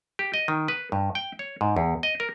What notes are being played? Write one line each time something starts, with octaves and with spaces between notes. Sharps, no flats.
G4
D#5
D#3
B4
G2
G5
C#5
G#2
E2
D#5
A#4